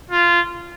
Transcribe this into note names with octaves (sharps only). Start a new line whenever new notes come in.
F4